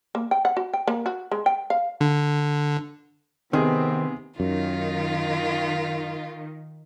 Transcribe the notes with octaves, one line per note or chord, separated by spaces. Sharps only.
A#3
G5
F#5
F#4
G5
A#3
F#4
G#3
G5
F5
D3
C3 D#3 B3 C4 G#4
F#2 D#3 F4